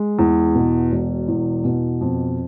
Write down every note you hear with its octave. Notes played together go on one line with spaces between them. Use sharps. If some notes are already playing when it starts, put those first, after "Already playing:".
Already playing: G#3
E2
B2
E1
E2
B2
F2